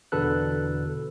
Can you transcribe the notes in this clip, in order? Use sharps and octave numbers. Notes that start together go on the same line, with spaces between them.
E2 B2 D3 A4 B4 F#6